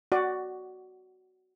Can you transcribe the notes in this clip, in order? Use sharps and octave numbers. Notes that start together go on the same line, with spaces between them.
F#4 D5